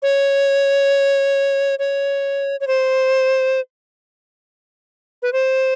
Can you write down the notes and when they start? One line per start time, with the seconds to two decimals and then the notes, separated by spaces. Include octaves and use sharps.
0.02 C#5
1.79 C#5
2.60 C#5
2.67 C5
5.22 B4
5.33 C5